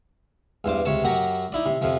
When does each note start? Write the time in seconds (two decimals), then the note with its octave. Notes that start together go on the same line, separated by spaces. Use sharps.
0.64 E2 G2 C5 D6
0.85 C#2 C3 C#5 A5
1.04 F#2 F#3 F#4 G4 A#5
1.52 D#4 E4 D5
1.66 C3
1.81 F2 C3 F3